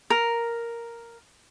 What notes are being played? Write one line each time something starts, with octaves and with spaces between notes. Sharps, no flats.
A#4